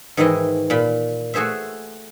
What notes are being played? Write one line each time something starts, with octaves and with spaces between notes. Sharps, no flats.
G#2 D#3 E3 G#3 E4 D#5
A#2 B5
A3 F#4 G#4 C5 E5